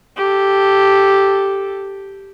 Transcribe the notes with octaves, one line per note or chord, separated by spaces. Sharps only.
G4 A4